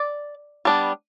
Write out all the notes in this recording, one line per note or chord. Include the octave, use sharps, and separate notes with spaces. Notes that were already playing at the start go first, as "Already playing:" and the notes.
Already playing: D5
G3 B3 D4